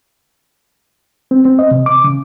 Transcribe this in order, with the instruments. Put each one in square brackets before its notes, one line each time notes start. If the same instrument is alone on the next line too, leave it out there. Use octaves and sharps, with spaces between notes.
[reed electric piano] C4
C4
D#5
C3
D6
C#3